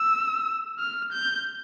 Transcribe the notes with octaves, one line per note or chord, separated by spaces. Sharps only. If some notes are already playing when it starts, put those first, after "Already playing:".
Already playing: E6
F6
G6